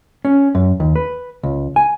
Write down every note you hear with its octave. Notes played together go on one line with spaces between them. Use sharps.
C#4
F#2
D#2
B4
C#2
G#5